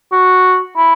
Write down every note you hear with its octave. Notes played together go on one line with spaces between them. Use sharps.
F#4
E4